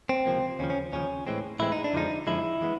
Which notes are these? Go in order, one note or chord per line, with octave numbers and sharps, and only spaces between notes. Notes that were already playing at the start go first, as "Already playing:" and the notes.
C4
C#2 C3 F3 A#3
D#2 C#3 F3 C#4
C#4
D#2 C#3 F3 C#4
A2 E3 G#3 C4
A2 E3 G#3 C4 E4
D#4
D4
F2 D3 F3 G#3 D#4
F2 D3 F3 G#3 E4
E3 G#3 B3